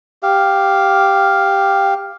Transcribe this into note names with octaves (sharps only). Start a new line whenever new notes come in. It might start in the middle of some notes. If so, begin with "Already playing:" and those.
G4 F5